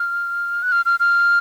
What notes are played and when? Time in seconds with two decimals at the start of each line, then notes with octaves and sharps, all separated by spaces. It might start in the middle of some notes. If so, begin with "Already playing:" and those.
Already playing: F6
0.63 F#6
0.72 F6
0.86 F6
1.00 F6